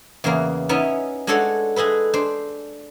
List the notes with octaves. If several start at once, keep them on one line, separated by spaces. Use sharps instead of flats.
E2 C#3 E3 A#3
B3 C#4 D#4 E4
G#3 D4 F#4 A4 C#5 F#5
G#3 G#4 A4 B4
D4 C5